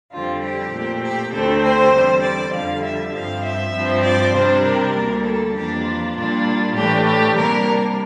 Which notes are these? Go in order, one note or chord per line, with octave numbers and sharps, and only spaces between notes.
F2 D3 G3 C4 F4
G4
A#2 A3 C4
G4
D2 D3 A3 C4 A4
C5
E2 D3 G3 C4
D5
F2 D3 G3 F5
E5
G2 F3 C4 F5
E5
G2 F3 C4
D5
C3 G3 D4 C5
A#4
D2 D3 G3 A#3 D4
A4
F2 E3 A#3 D4 G4
F4
A#2 G3 A#3 D4
A2 E3 A3 D4 G4
G4
C3 G3 A#3 D4 A#4